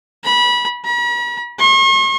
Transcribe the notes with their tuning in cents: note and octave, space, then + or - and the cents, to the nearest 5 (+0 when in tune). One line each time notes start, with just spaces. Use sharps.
B5 -25
B5 -45
C#6 -45